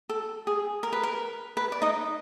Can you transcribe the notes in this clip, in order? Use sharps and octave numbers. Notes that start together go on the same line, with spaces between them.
A4
G#4
A#4
B4
A#4
B4
D5
D#4 D#5